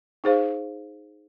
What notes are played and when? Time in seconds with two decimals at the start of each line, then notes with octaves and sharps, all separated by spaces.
0.24 D#4 G#4 C5 F5